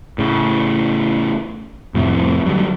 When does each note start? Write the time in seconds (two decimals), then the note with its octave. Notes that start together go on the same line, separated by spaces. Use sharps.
0.18 A2 C#3
1.94 F2 A2 C3 F3
2.46 D3 D#3 F#3 G3